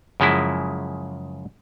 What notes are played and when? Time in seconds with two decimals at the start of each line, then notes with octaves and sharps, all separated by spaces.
0.20 F#2 C#3 F3 G#3 E4